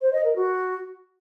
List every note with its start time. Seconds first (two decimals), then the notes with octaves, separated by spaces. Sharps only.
0.01 C5
0.13 D#5
0.24 A#4
0.36 F#4